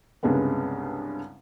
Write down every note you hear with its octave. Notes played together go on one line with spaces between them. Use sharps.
C2 G2 C#3 G#3 B3